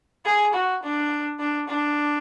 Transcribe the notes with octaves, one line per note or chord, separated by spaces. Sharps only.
G#4
F#4
D4
D4
D4